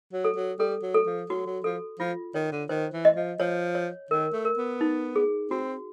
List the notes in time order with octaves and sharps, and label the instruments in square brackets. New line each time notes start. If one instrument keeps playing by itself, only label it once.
[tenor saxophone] F#3
[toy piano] A4
[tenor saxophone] F#3
[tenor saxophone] G3 [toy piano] A4
[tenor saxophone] F#3
[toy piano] A4
[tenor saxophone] F3
[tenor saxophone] F#3 [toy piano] F#4
[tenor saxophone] F#3
[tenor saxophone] F3 [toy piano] A4
[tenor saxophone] F3 [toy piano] F4
[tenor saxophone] D#3 [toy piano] C#5
[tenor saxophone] D3
[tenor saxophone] D#3 [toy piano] C5
[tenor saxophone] E3
[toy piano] D#5
[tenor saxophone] F3
[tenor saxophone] F3 [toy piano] C#5
[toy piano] C#5
[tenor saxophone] D#3 [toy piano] A#4
[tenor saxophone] A3
[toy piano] A#4
[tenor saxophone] B3
[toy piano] D#4
G#4
[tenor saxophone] C4 [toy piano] F#4